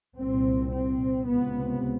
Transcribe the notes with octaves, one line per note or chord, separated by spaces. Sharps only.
C2 A#2 C4
C4
C#2 C3 B3